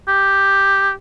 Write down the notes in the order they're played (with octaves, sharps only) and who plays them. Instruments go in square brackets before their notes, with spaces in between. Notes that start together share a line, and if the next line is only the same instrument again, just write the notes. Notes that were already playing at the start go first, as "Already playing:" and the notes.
[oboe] G4